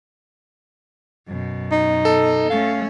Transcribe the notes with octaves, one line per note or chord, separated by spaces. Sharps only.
F#2 B2
D#4
A4
A3 C#4 F5